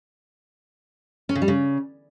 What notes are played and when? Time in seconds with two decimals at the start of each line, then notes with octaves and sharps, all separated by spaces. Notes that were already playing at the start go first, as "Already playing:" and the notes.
1.29 C#4
1.35 C#3
1.42 G3
1.48 C#3